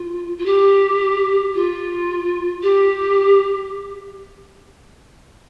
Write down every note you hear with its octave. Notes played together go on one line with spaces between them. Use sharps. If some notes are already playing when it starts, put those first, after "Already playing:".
Already playing: F4
F4
G4
F4
G4